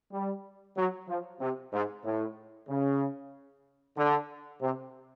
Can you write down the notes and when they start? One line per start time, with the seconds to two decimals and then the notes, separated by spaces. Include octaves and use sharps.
0.12 G3
0.77 F#3
1.09 F3
1.41 C3
1.73 G#2
2.05 A2
2.69 C#3
3.98 D3
4.61 C3